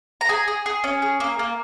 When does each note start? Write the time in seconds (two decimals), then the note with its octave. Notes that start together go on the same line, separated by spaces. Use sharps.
0.21 A#5
0.29 G#4 G#5
0.48 G#4
0.66 G#4
0.84 C#4
1.02 G#4
1.20 A#3
1.39 A#3